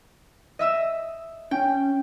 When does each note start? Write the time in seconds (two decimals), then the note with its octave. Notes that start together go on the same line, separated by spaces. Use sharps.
0.59 D#5 E5 E6
1.51 C#4 G5